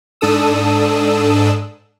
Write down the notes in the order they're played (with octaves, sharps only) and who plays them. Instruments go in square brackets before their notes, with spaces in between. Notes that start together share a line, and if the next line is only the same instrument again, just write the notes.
[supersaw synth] G#2 D4 A4 D#6 E6